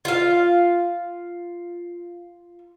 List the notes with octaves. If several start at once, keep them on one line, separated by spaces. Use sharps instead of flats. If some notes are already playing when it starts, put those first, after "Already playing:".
F4 F5